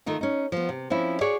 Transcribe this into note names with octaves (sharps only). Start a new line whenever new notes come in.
D#3 A3 D#4 F4
C#4 D#4
F3 B3
C3
F3 C4 C#4 E4
F#4 G#4 C#5 D5